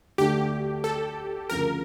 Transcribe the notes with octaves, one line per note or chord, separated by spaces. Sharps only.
D2 D3 A3 D4 G4
A4
D2 C#3 F3 A#4